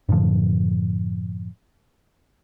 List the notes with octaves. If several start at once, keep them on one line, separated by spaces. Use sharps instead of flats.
F#2 A2 D3 F3